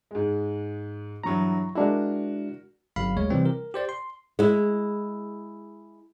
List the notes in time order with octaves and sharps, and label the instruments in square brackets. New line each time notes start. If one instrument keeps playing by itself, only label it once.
[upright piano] G#2 G#3
[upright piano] G2 E3 F#3 [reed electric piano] A#5 C#6
[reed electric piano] G#3 D4 E4 [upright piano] F#4 A#4
[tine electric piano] G1 F#3 F5 B5
D2 G#3 C#5
C3 E3 G3 C4
A#4
G4 C5 D5
C6
[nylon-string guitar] G#3 E4